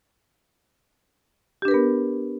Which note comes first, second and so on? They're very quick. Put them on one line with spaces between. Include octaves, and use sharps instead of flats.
G4 D4 B4 A#4 B3